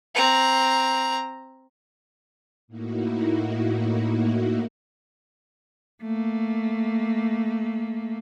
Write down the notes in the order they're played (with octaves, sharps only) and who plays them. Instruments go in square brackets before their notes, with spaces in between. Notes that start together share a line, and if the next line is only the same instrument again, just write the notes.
[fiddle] C4 A#5
[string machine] A2 A#3 D#4 E4 F#4
[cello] A3 A#3